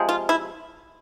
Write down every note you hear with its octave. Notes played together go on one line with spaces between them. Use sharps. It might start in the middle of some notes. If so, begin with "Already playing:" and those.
Already playing: C3 F3 G#3
F4
E4